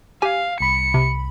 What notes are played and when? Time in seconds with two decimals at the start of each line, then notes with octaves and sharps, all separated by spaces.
0.22 G4 F5 G#5
0.61 C2 B5 C#7
0.94 C3